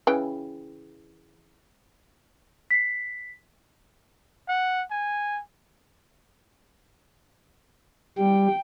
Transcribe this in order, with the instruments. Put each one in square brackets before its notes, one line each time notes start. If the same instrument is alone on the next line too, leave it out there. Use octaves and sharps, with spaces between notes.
[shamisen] C#3 E3 G5
[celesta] B6 C7
[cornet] F#5
G#5
[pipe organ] G3 [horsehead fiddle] G5